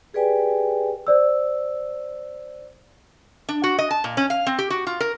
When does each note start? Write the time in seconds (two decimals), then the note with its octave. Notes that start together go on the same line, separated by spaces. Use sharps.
0.14 G4 G#4 B4 D5 G5 G#5
1.07 C5 D5 E6
3.49 D4
3.64 F#4
3.79 D#5
3.91 A5
4.04 A#2
4.17 C#4
4.30 F5
4.47 C4
4.59 G4
4.70 F#4
4.87 F4
5.00 A#4